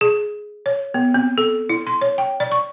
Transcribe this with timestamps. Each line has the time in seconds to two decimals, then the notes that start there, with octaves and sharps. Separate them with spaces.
0.01 G#4
0.66 C#5
0.94 B3
1.14 C4
1.38 A4
1.69 E4
1.87 C6
2.01 C#5
2.18 G5
2.40 D5
2.52 C#6